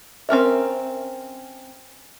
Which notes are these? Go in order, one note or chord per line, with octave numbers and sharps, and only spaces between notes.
C4 C#4 A#4 E5